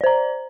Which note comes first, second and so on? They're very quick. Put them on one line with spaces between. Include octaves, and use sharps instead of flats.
D5 C5 A#5